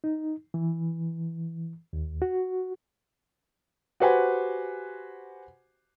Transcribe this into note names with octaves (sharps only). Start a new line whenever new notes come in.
D#4
E3
D#2
F#4
F#4 G4 B4 C5 F#5 G#5